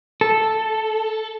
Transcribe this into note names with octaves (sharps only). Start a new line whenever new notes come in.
A4